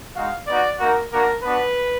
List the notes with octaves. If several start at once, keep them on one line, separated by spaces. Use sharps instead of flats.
G#3 D#4 F#4 F5
B3 D#4 F#4 D5
A#3 D#4 F#4 A#4
A#3 D4 F#4 A#4
B3 D4 F#4 B4